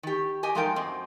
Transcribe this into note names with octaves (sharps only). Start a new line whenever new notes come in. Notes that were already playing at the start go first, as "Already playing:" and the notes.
D#3 G4
G4 D#5 G#5
F3 G#3 A3 D#4 A#4 G5
F#2 C4 D#5